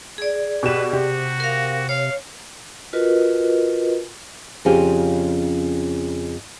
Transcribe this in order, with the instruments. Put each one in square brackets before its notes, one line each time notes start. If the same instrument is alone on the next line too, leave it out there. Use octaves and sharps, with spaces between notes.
[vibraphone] G#4 D5
[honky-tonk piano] B2 G4 E7 [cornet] B4
[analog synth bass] C3 [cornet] F#4 [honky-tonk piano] G4
[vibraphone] A#4 F5
[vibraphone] C#5 [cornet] F5
[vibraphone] F4 F#4 A#4 B4 D#5
[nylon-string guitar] F2 C#3 C#4 F4 G4 G#4